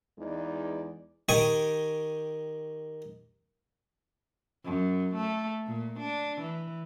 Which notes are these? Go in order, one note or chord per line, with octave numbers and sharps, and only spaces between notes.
E2 G#3 D#4 B4 D5
D#3 G4 D#5 G5 G#5 C#6
F#2
A3
A#2
D4
E3